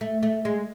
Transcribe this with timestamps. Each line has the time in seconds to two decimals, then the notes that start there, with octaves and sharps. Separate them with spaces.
0.01 A3
0.23 A3
0.45 G#3